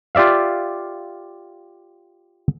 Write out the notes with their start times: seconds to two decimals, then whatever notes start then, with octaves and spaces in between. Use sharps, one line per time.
0.15 F4 G4 D5 E5 F5